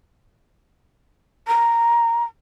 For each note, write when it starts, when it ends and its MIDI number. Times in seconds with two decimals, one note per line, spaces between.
1.48 2.23 82